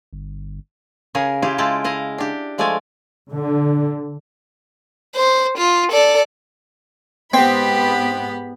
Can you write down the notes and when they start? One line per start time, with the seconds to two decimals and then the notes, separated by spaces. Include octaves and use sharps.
0.13 G1
1.15 C#3 G#4 A#4 G#5
1.42 E4 F4 G4 G#4
1.58 G#3 E4 F4 G5 A5
1.84 E4 D#5 F5
2.18 D4 G4
2.58 F3 G#3 A3 D5 F5 G#5
3.31 D3
5.16 C5
5.58 F4
5.92 A4 D5
7.34 G#2 B3 C4 G4 B5